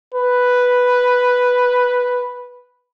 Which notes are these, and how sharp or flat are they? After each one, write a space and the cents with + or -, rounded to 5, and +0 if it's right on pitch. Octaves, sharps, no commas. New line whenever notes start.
B4 +0